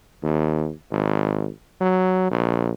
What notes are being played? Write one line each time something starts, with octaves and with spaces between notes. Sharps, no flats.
D#2
G#1
F#3
A#1